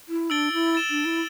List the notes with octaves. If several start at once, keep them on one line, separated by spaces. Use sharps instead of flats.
E4
D4 E6 A6 D7 G7
E4
A6 E7 G7
D4
E4